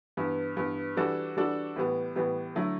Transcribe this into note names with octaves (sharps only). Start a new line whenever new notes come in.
G2 E3 B3
G2 E3 B3
E3 G3 D4 F#4 A4
E3 G3 D4 F#4 A4
A2 E3 G3 B3
A2 E3 G3 B3
D3 F#3 A3 E4